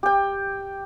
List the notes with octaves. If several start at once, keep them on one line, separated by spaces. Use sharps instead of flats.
G4 G5